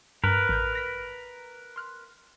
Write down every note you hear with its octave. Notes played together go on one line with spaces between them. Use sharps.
G2 A#4 B4
A1 G6
F6 A#6 B6
C6 F6 F#6